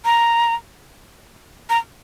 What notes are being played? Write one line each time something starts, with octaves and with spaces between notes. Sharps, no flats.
A#5
A#5